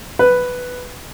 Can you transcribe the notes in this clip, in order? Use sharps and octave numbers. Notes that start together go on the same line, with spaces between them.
B4